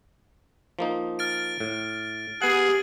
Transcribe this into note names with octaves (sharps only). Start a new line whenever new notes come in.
F3 A#3 D#4
F6 A6 D7
A2
B3 G4 G#4 F#5 F#7